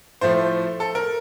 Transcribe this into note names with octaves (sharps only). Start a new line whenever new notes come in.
A2 F3 A3 C5
A4
A#4